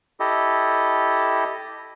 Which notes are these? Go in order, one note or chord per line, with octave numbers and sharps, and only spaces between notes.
E4 G4 A4 D#5